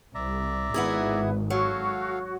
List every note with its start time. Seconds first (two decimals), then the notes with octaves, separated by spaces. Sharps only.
0.15 C2 D5 E5 A#5
0.74 G#1 B3 E4 G#4 B4
1.50 F#3 F#4 A4 C#5 F5